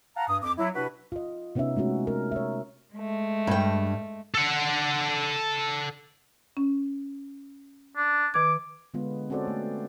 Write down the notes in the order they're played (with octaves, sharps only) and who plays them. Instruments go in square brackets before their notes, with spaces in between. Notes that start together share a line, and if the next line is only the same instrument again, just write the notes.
[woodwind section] F5 F#5 A5 A#5
G2 D#6
F2 D6
F#3 E4
C3 D4 E4 F#4 B4
[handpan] F4 D#5
C3 B3 C#4 D#4 E5
G#3 A3 C#4 F#4
A#4
C#5 E5
[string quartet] G#3 A3
[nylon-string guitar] G2 G5
[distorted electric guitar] A4 F#5
[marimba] C#4
[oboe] D4
[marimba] D#3 B4 G#6 [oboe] D6
[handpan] D3 G#3 B3 F4
C4 C#4 F#4 A4 C5 D5
A3